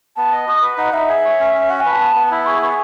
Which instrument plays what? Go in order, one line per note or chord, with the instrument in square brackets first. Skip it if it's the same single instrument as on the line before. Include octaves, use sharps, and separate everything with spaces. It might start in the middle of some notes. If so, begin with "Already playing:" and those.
[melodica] B3 [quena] A5
[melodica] D#5
[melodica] F#4 [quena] D#6
[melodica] B4
[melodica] D#4 [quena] F#5
[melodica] D#4 [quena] E5
[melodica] G#4
C#5
C#4
C#4
[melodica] F#4 [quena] F#5
[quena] G#5
[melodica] B4 [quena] A5
[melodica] B3
B3
[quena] A5
[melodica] E4 [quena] B5
[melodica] G#4 [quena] C#6
[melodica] B3 [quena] C#6